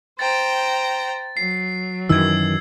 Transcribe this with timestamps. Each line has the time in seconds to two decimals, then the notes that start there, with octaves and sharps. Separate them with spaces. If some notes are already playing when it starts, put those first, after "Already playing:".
0.19 C5 G5 A#5 A6
1.37 F#3 C7
2.09 F#2 D#3 E3 E6 G#6